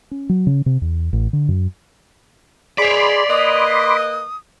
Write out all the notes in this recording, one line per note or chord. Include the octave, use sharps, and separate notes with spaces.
C#4
F#3
C#3
C3
E2
A1
D3
F#2
G#4 C#5 D5 B5 C6 D6
A#3 B4 D#5 D#6